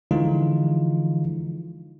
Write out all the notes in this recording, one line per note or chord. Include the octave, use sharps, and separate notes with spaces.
D3 E3 F3 G#3 D#4 F4